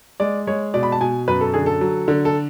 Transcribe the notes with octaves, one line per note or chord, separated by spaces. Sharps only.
G#3 D5
G#3 C#5
B2 D5
B5
A5
B2 G#5
F#2 B4
A4
D3 G#4
A4
F#3
D3
A4